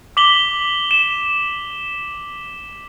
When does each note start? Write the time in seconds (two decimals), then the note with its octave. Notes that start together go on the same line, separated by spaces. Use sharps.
0.17 D6 B6 F#7 G7
0.91 E7